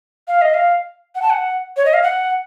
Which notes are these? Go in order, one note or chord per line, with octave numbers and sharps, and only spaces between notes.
F5
D#5
F5
F#5
A5
F#5
C#5
D#5
F5
F#5